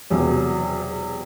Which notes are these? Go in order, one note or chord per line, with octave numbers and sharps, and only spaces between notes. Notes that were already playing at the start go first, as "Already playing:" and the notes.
E1 E2 C3 F#3